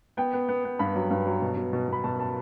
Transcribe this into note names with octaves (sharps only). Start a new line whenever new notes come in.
B3 G5
B3
B3
B3
G2 B5
F#3
G2
F#3
B2
B2
B2
B2 B5
B2 A5
A5